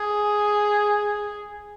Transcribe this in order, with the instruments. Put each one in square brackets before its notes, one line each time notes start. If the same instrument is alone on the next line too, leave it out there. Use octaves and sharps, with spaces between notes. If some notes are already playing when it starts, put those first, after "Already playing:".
Already playing: [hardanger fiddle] G#4